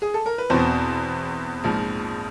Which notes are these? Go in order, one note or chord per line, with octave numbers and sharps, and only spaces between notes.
G#4
A4
A#4
B4
E2 B2 C4 C5
A#1 G#2 F3